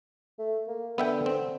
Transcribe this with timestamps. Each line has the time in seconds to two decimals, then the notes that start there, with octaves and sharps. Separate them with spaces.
0.39 A3
0.68 A#3
0.98 D3 B3 E5 G5
1.26 C4